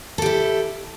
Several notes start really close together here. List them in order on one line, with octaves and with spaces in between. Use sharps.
A4 G4 E4